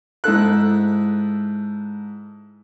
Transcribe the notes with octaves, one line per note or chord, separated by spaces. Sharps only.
G#2 E4 A4 F#6